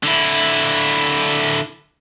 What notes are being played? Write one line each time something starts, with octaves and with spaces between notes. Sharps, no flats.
D3 E4